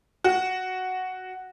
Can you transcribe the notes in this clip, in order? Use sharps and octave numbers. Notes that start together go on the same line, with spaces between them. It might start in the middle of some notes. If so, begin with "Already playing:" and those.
F#4